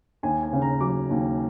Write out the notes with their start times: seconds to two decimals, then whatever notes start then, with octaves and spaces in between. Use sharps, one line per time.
0.23 D#2 G#5
0.43 G#5
0.53 C#3
0.62 A#5
0.81 F#3 D6
1.10 D#2